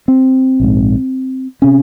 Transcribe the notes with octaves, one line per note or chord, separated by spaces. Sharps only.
C4
A#1 G#2
C3 C#4